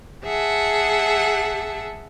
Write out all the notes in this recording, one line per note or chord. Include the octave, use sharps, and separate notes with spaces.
G#4 E5 F#5 A5